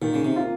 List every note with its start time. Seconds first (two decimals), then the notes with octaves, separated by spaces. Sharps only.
0.02 A#2 D#3
0.14 C#3
0.24 C3
0.36 A#3 F4